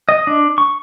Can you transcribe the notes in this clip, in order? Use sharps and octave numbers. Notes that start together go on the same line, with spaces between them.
D#5
D4
C#6